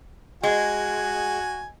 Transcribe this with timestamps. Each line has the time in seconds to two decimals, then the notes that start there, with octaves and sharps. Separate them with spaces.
0.43 G#3 F#4 G#5